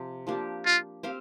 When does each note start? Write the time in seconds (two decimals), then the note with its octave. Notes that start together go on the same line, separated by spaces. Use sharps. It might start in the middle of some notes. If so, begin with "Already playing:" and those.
Already playing: C3 F3 C4
0.27 F3 A#3 D4 G4
0.66 F4
1.03 C4 G4 C5 F5